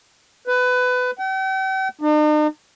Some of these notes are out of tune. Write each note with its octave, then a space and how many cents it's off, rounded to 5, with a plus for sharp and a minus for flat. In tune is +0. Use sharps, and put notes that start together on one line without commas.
B4 +20
G5 -45
D#4 -45